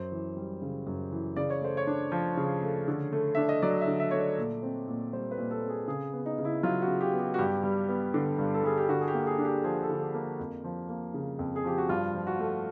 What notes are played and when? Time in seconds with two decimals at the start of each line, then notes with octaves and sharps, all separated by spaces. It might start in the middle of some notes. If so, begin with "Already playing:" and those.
Already playing: F#2 C5
0.12 E3
0.37 G3
0.62 C#3
0.87 F#2
1.12 E3
1.36 C#3 D5
1.50 C#5
1.62 A3 C5
1.77 C#5
1.87 D4
2.12 F3
2.37 C#3
2.63 A3
2.88 D3
3.13 A3
3.35 D4 E5
3.49 D#5
3.62 F#3 D5
3.81 E5
3.88 D3
4.00 E5
4.11 A3 C#5
4.19 D5
4.38 A#2
4.63 C4
4.88 A#2
5.13 G3 C5
5.31 B4
5.38 A#2
5.51 A4
5.63 C4
5.69 G#4
5.88 C#3 G#4
6.13 B3
6.26 D#4
6.38 C#3
6.45 E4
6.63 F#3 F4
6.82 F#4
6.88 C#3
7.01 G4
7.13 B3
7.19 G4
7.34 F#4
7.39 G2 G4
7.64 G3
7.89 B3
8.14 D3
8.38 G2
8.54 A4
8.64 G3 G#4
8.78 G4
8.89 D3 F#4
9.01 G#4
9.08 G4
9.14 A#3
9.27 G#4
9.38 D4
9.45 G4
9.64 F3 G#4
9.83 A4
9.89 D3
10.02 G#4
10.14 A#3
10.40 F2
10.64 F3
10.89 A#3
11.14 C#3
11.39 F2
11.56 G#4
11.64 F3 G4
11.78 F#4
11.89 G2 F4
12.14 F3
12.27 F#4
12.39 A3